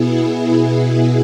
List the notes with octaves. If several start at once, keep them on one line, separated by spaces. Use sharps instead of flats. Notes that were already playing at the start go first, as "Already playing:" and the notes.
Already playing: B2 B3 E4 G#4